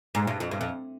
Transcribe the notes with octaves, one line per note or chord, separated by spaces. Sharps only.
G#2
G2
F2
G2
F2